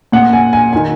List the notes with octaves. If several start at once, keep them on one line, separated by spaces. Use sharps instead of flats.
A#2 F#5
G#5
G#5
D#3 G#5